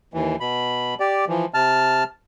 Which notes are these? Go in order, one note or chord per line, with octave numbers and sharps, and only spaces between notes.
D#2 E3
B2 B5
G4 D5
E3 F3
C3 A5 F6